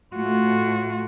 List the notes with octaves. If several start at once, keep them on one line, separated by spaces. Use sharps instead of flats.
A2 A3 F4 F#4